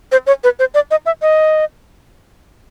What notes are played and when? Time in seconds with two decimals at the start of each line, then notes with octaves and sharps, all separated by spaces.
0.12 C5
0.27 C#5
0.44 B4
0.59 C5
0.75 D5
0.91 D#5
1.06 E5
1.22 D#5